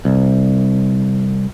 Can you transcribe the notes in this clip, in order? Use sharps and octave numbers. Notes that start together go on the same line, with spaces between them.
C2